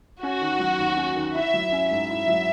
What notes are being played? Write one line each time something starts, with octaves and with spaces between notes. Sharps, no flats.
C#4 F#4
D#3
F#3
D#2
C#4
D#3
E4 E5
F#3
C#4
G#2 E5
E4
F#3